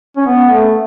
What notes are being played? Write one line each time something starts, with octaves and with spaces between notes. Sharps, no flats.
C#4
B3
A3